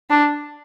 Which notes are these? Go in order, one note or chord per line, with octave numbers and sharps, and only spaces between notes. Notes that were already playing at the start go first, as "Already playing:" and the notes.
D4